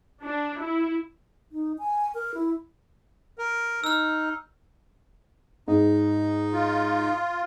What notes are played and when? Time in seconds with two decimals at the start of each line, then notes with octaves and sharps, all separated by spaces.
0.23 D4
0.61 E4
1.52 D#4
1.79 G#5
2.14 A#4
2.34 E4
3.38 A#4
3.84 D#4 E6 F6
5.68 G#2 D#4
6.53 F4